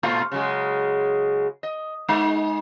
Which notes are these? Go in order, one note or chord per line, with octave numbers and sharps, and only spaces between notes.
A#2 A3 F4
C#3 F#3 G#3
D#5
G#3 D#4